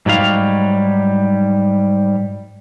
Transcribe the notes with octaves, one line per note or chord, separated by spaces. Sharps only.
G#2 F#3 G3 F5